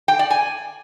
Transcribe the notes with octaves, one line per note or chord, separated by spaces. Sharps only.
G5
D5
G#5